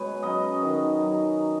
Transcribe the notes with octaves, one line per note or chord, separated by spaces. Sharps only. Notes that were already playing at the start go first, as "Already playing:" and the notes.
Already playing: B2 G#3 B4 C#5
F#3 C#4 D#5
D#3 D#5
F#3 D#4